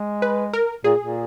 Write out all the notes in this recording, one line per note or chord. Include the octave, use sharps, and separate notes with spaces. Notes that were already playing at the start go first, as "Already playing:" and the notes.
Already playing: G#3
B4
A#4
A#2 G#4
A#2